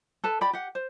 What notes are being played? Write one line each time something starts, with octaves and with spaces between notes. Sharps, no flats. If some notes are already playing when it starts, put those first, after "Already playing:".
A4 B4 A5
G4 D5 G5 B5
G4 F#5
C5